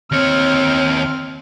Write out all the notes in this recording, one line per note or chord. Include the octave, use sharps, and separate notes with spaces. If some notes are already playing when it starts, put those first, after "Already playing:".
D#2 C4 C#5 F6